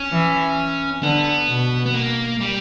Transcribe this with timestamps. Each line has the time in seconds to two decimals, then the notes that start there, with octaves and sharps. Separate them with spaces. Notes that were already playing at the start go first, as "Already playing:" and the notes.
Already playing: C#4
0.11 E3
1.03 D3 B3
1.48 B2
1.86 B3
1.94 A#3
2.41 G3